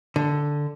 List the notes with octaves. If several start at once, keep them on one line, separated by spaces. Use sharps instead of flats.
D3